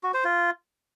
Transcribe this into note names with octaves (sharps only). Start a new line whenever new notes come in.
F#4
C5
F4